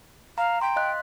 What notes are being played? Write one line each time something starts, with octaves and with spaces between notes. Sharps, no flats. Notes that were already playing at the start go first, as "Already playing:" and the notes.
F5 A#5
G5 C6
D#5 F5 F#6